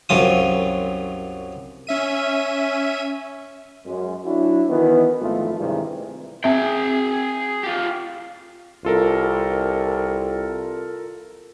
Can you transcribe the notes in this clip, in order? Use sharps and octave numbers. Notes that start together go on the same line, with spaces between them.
C2 F#2 F#3 F4 D#6
C#4 E5 D#7
F#2 G#3
F#3 D4 E4 F#4
D#3 E3 B3
G#1 F2 A3 F4
G2 C3 D#3 E3 G#3
C4 G#4 E5 G5
F4 G4
C2 F4 A4 A#4